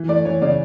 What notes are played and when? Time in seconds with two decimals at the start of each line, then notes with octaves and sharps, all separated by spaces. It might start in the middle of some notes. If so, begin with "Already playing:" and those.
Already playing: E3
0.08 A3 D5
0.25 E3 C#5
0.42 C#3 D5